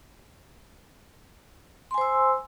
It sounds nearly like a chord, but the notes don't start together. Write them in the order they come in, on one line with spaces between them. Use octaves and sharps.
C6 G#5 C5 E6